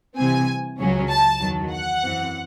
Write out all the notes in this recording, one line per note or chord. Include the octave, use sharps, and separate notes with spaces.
C2 C3 E3 C4 G#5
C#2 C#3 F#3 C#4
A5
E2 D#3 F#3
F#5
F#2 E3 C4